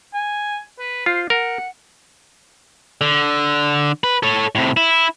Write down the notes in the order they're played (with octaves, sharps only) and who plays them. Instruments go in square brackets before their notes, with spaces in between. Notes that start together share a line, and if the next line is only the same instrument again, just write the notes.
[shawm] G#5
B4
[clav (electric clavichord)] F4 [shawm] C5
[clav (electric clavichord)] A#4 [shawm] F#5
[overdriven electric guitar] D3
B4
A4 C#5
A2 C3
E4